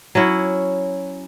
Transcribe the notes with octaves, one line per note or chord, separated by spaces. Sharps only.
F#3 C#4 E4